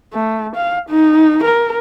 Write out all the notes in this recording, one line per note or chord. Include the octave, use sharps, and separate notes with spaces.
A3
F5
D#4
A#4